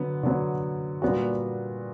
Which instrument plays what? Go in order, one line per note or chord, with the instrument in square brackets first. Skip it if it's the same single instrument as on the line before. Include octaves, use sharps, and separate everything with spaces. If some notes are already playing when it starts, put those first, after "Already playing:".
Already playing: [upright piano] D3 F#3 B3
D3 F#3 B3
A#2 G3 B3 D4 F#4